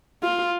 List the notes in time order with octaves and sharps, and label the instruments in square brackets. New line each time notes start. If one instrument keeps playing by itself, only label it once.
[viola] F4